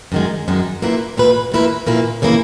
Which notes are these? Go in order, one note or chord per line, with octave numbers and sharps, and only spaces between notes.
F#2 D#3 G#3
F#2 D#3 G#3
A#2 A#3 E4 B4
A#2 A#3 E4 B4
A#2 A#3 E4 B4
A#2 A#3 E4 B4
C#3 E3 A#3 E4